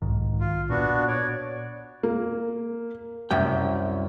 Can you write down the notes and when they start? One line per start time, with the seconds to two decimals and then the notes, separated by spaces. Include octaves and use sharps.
0.02 B1 G#2 D#3
0.40 F4
0.70 A#2 B3 D4 F#4
1.08 C#5 D5
2.03 A#3
3.31 C2 F#2 G5